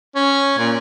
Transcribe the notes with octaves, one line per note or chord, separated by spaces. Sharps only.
C#4
A#2